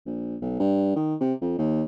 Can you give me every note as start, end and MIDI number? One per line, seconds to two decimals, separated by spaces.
0.06 0.36 34
0.41 0.59 35
0.60 0.91 43
0.96 1.15 51
1.21 1.34 48
1.42 1.57 41
1.58 1.84 39